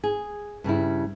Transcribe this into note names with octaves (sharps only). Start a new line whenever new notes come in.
G#4
G2 C#3 G3 E4